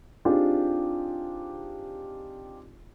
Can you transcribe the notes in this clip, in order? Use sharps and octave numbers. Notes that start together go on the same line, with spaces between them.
C4 D4 D#4 F4 G4 G#4